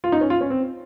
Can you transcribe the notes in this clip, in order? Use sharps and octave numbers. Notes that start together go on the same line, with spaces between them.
F4
D#4
C#4
F4
C#4
C4